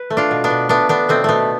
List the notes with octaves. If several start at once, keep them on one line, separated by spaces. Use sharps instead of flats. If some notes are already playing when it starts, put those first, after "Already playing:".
Already playing: B4
A3
D4 F4
B2
B3 D4
B2
A3 B3 D4
A3 B3 D4
B2 A3 C4
B2 A3 B3